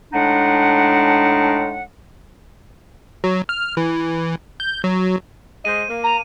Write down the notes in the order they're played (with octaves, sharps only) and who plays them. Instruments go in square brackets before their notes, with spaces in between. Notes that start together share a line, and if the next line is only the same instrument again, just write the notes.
[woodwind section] A2 G#3 D4 D#4 F#5
[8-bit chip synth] F#3
F6
E3
G6
F#3
[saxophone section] G#3 C5 D#5 [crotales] D#7
[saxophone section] A#3
[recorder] A#5